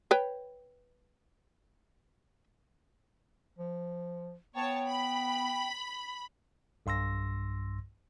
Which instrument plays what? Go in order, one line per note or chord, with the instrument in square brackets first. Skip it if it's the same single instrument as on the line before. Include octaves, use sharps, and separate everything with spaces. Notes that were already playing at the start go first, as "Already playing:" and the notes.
[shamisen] B4 C#5 G5
[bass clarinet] F3
[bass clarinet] B3 [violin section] C#5 A5 [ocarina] G5
[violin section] B5
[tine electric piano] B1 G2 C6 E6 A#6